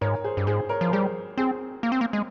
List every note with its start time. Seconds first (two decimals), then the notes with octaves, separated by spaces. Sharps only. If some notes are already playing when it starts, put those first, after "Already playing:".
0.01 G#2 A#4 C#5
0.24 G#4 C5
0.37 G2
0.47 G#2 G#4 C5
0.69 A#4 C#5
0.81 F3
0.88 A#4
0.92 G3 G#4 C5
1.38 C4 G#4 C5
1.83 A#3
1.92 C4
2.01 A#3
2.13 G#3